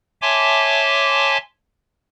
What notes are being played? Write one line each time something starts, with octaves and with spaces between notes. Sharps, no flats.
C#5 E5 G#5 A5 C6 D6